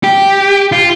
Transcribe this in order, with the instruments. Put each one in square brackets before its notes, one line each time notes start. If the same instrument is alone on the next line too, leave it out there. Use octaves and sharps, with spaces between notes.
[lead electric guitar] G4
F4